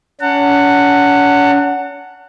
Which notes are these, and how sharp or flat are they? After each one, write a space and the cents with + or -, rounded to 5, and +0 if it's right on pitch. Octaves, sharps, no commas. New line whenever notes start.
C#4 +40 F#5 +0 A5 +45